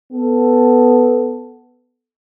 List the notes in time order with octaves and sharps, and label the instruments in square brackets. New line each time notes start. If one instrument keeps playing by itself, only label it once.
[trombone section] B3 A4